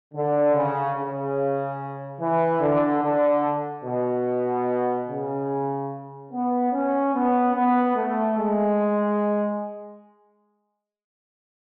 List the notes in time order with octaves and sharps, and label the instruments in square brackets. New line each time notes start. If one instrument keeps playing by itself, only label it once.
[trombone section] D3
C#3
C#3
E3
D3
D3
B2
C#3
B3
C#4
B3
B3
A3
G#3